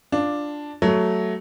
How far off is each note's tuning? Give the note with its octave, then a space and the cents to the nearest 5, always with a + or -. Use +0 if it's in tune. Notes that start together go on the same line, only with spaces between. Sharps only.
D4 +0 F4 +0 F5 +0
F#3 +10 A3 +0